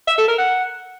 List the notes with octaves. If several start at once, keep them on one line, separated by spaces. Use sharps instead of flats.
E5
A4
A#4
F#5